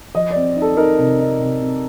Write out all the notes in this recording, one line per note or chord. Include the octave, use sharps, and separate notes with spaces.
F3 D#5
C4 D5
D#4
A4
D#4 A#4
C3
D#4
C3
C3